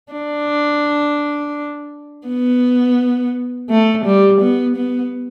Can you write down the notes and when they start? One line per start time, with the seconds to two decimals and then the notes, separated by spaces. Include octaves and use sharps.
0.13 D4
2.27 B3
3.70 A3
4.05 G3
4.41 B3
4.77 B3